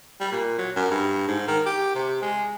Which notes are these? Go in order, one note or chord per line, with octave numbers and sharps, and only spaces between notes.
G3
A#2
F#3
F#2
G2
G#2
D#3
G4
C3
G#3